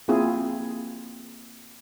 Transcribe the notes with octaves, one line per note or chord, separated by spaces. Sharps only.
A#3 C4 E4 F4 G#4